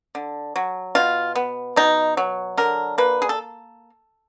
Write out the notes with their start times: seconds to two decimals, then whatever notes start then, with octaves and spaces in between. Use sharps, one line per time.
0.15 D3
0.56 F#3
0.95 B2 F4
1.35 B3
1.76 B2 D#4
2.17 F#3
2.57 D3 A#4
2.98 A#3 B4
3.22 G#4
3.29 A4